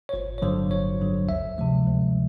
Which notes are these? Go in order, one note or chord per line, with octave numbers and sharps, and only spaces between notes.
C#5
G1 C5
C#5
G2 D3 F#3 C5
G1 C#5
G2 D3 F#3
D2 E5
C3 F3 G#3
D2